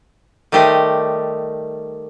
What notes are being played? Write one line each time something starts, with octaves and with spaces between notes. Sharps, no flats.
D#3 G3 A3 G4 C5 D#5